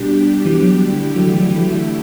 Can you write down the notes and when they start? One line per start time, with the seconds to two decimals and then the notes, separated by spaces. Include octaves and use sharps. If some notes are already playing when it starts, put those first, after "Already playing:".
Already playing: B2 G3 D4 G4
0.45 E3
0.62 F#3
0.80 D3 A3 E4 G4
1.15 F#3
1.27 E3
1.38 F#3
1.50 E3
1.60 F#3
1.70 E3